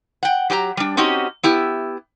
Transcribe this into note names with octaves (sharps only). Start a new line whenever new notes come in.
F#5 G5
F#3 G4 G#5 A#5
G3 D4
C4 C#4 D#4 F#4 G4
B3 E4 G4